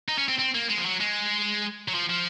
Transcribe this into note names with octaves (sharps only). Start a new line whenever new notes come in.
D#4
C#4
C4
C4
A#3
G#3
F3
F#3
G#3
F#3
F3
F3